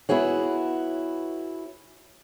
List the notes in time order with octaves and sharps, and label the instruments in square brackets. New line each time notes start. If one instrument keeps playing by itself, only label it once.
[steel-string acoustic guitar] B3 E4 F#4 G#4 C#5